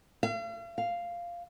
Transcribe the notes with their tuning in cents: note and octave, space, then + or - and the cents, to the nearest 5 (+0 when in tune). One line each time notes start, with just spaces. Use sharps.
F5 -45
F5 -5